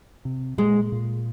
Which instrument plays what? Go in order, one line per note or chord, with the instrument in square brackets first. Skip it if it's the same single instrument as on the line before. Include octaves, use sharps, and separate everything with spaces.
[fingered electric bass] C3
[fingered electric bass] A#2 [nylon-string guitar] G#3
[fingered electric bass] A#2